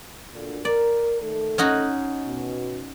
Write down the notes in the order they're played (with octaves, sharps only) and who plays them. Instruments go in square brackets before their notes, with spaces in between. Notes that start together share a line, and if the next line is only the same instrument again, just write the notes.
[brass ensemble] D2 A#2 D3
[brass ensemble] A#4 [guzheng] D5
[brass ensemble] D#3 A3 A4
[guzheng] C#4 D#4 F#4
[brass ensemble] B2